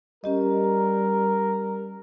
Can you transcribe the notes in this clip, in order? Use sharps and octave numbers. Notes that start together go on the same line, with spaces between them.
G3 C#4 G4 A#4 D#5